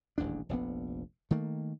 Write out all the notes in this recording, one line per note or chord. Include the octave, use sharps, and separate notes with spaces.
D#1 A1 E2 D4
F1 A#1 C3 B3
D#3 A3 A#3